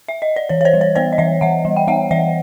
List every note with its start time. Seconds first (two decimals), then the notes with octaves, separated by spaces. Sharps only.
0.08 E5
0.22 D#5
0.36 D5
0.49 E3 C#5
0.61 C#5
0.65 C5 D5
0.74 G3
0.81 C#5
0.95 B3 C5 D5
1.13 D#5
1.18 E3 D5 E5
1.41 E3 E5 F#5
1.65 G3
1.77 G5
1.87 B3 E5 F#5
2.11 E3 D5 E5